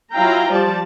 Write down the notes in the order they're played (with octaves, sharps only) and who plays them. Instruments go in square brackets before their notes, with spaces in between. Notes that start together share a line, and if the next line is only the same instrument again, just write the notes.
[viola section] F#3 E4 F4 F5 G5 A#5
F3 G3 D5 A5